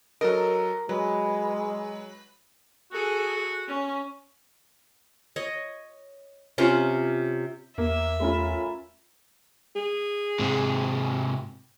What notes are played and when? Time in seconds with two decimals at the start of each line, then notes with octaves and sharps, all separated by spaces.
0.21 F#3 A4 A#4 D#5
0.89 F#3 G#3 B4
2.93 F#4 G#4 A4
3.67 C#4
5.36 C#5 D#5
6.58 C3 C#4 F4 C5
7.78 E2 A#3 E5
8.20 A3 C#4 F4 A#4 B5
9.76 G#4
10.39 G#2 C3